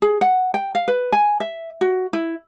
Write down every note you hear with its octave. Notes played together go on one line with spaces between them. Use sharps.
G#4
F#5
G5
F5
B4
G#5
E5
F#4
E4